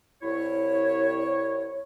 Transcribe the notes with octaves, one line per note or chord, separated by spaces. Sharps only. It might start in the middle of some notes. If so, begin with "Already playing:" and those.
C2 E4 C#5